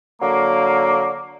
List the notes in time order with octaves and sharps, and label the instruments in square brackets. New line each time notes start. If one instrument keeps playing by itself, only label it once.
[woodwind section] D3 F#3 A#3